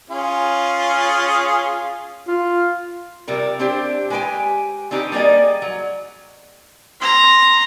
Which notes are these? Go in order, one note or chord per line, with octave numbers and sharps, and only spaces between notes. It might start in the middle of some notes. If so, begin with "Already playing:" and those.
C#4 F4 G#4
F4
C3 G3 A#4
C4 D4 E4 G4 C5
G#3 G4 B4 C5 G5 G#5
C4 D4 D#4 G4 B4
G3 A#3 G#4 D5 D#5
F#3
A#5 C6